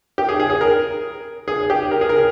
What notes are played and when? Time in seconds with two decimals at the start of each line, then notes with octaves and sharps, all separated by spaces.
0.18 G4
0.29 G#4
0.40 G#4
0.50 G#4
0.61 A#4
1.48 G#4
1.70 G4
1.91 A#4
2.01 G#4
2.09 A#4